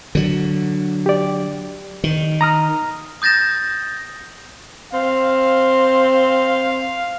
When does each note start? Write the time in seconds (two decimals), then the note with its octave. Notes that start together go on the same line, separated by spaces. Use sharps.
0.15 D3 F#3
1.06 G4 D5
2.04 D#3
2.41 A#5 D#6 F6
3.22 D#6 G6 A6 A#6 E7
4.93 C4 F5